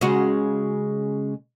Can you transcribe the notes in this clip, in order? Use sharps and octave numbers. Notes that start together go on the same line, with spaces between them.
C#3 G#3 F#4